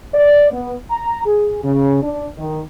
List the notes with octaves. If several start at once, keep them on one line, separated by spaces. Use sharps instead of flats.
D5
B3
A#5
G#4
C#3
D4
D#3